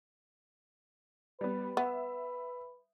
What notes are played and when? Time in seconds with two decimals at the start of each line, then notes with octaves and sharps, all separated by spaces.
1.41 G3 B3 B4
1.77 B3 E5